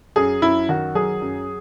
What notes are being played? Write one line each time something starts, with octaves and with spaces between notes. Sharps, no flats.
F#2 G#4
F#2 E4
D#3 F#4
F#3 G#4
F#2